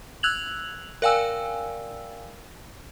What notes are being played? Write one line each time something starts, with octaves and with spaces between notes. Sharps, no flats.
E6 F#6 G#6 F7 F#7
A#4 D5 F5 G5 G#5 E6